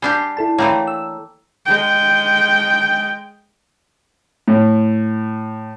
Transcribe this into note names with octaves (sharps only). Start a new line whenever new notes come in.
G3 D4 G4 G#5 G6 C7
E4 A4 A5
E3 A3 A#3 C#5 G5 A#5
E6
G#3 G5
A2